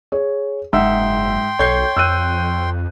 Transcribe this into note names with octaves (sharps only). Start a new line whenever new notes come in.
G#4 C#5
F#1 G#2 E5 F#5 G5 C6 E6
B1 A4 C#5 G6 C7
F2 E6 F#6 D#7